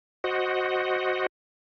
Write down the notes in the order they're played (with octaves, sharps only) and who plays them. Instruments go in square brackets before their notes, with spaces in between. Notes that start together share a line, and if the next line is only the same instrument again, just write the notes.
[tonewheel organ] F#4 C5 D#5 F#5